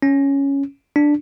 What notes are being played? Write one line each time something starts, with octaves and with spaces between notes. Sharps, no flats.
C#4
D4